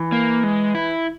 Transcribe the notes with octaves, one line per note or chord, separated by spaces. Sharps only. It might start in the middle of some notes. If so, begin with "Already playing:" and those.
Already playing: E3
A#3
G#3
E4